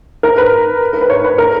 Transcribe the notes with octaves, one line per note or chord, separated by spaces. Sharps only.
A#4
B4
A#4
B4
C#5
B4
A#4